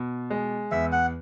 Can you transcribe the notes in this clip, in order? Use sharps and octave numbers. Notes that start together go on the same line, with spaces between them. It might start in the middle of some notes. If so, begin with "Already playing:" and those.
Already playing: B2
G#3
E2 E5
F#5